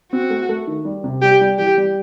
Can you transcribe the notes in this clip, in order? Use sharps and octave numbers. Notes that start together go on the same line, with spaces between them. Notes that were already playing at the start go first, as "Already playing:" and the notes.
C4 F#4
A3
A3
D#3
G3
C3
G3 G4
G3
E3 G4
G3